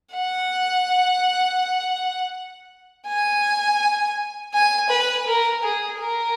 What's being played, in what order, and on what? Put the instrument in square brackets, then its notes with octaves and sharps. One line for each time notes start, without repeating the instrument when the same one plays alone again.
[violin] F#5
G#5
G#5
B4
A#4
G#4
A#4